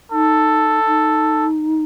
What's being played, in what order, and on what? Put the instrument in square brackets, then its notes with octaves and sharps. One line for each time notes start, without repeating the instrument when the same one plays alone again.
[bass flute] D#4 [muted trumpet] A4
[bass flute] D#4